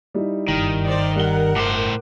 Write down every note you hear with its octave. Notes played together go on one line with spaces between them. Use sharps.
G3 D#4 E4
F#1 G2 D#3
C5 D5
G3 A#4 F#5 G7
A2 C5 D6